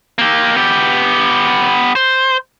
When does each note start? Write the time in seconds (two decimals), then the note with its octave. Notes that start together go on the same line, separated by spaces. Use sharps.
0.18 A#3 G4
0.56 B3 G4
1.95 C5